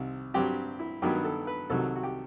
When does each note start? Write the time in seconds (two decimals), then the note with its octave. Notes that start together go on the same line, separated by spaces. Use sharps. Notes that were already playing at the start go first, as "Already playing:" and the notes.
Already playing: C2 C3 D#3
0.34 G2 F#3 C4 G4
0.79 E4
1.02 G2 D#3 F#3 B3 G4
1.25 A4
1.47 B4
1.70 C2 C3 D#3 F#3 A4
1.96 F#4
2.03 G4